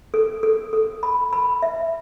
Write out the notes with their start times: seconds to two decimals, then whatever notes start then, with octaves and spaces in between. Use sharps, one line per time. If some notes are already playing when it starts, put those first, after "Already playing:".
0.14 A4
0.43 A4
0.73 A4
1.03 B5
1.33 B5
1.62 E5